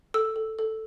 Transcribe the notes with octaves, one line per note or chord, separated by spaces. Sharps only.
A4 E6
A4
A4